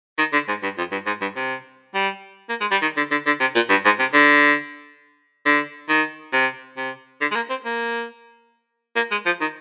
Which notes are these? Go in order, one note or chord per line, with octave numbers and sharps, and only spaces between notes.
D#3
D3
G#2
G2
F2
G2
G#2
G2
C3
G3
A#3
G#3
G3
D#3
D3
D3
D3
C3
A#2
G2
G#2
C3
D3
D3
D#3
C3
C3
D3
G#3
A#3
C4
A#3
A#3
G#3
F3
D#3